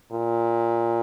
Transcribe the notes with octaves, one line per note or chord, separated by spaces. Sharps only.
A#2